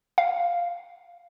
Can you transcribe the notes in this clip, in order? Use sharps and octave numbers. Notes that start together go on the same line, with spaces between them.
F5